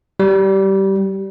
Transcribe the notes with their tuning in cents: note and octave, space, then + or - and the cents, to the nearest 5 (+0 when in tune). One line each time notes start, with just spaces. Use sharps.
G3 -20